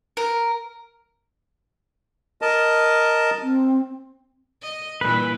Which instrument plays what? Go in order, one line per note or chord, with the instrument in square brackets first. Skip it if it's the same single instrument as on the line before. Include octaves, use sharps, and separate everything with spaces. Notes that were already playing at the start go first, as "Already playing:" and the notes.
[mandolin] A#4
[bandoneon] A#4 D#5 A5
[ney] C4
[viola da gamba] D#5
[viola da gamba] G2 A#2 E3 [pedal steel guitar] B4